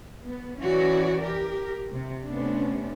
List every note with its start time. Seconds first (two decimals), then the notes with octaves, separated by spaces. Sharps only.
0.23 B3
0.61 E3 C#4 F#4 C#5 D5
1.22 G4 A#4
1.92 C3
2.27 C3 A3 B3 C#4 D4